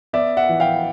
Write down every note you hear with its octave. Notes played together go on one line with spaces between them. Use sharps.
B3 D5 E5
E5 F#5
E3
F5 G5